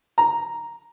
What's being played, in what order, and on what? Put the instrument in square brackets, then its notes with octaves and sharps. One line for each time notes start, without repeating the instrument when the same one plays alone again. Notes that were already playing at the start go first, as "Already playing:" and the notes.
[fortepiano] A#5